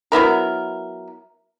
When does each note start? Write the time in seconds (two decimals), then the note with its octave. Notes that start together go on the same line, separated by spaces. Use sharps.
0.12 F#3 B3 E4 A#4